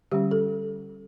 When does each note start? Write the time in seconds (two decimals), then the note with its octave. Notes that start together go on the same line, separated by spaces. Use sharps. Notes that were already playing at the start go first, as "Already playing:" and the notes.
0.11 D3 G3 C#4 G4
0.31 A4